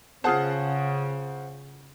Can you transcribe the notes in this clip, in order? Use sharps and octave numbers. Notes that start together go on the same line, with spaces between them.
C#3 F4 G#4 C5 F#5 A5